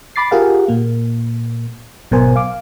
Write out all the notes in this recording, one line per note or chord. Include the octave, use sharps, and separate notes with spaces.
B5 D6 A6 C7
F4 G4 G#4 A#4 F5 F#5
A#2 A#3
G#1 B2 F#3 A#4 C5 G#5
F5 D6